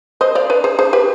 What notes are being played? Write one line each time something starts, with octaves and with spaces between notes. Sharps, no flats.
C5 D#5
D5 F5
B4 D5
G#4 C5
G#4 C5
G4 B4